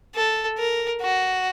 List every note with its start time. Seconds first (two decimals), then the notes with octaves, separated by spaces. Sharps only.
0.15 A4
0.58 A#4
1.02 F#4